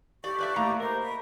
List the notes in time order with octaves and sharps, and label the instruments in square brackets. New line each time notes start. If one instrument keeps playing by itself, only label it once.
[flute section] G4 A4 C#6 [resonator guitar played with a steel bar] D5
[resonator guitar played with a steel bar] B4 D5 E5
[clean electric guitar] A2 [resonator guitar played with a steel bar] A#3 A#5
[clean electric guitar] A#4 [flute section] C5 D#5
[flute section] B5